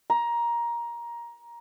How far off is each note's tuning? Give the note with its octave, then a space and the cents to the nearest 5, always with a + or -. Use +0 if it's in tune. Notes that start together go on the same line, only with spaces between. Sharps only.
A#5 +15